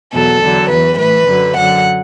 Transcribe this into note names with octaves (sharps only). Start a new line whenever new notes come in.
E2 B2 F#3 A4
E2 D3 F#3
E2 E3 B4
A2 E3 B4
F#2 D3 F#3
F#2 D3 F#3 F#5